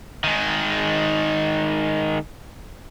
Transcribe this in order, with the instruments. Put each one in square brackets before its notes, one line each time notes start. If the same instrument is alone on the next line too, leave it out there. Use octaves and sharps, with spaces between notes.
[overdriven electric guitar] D#3 G#3